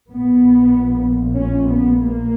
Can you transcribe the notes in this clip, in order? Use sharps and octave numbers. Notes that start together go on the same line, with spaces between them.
A#1 A#2 B3
C#4
B3
A#3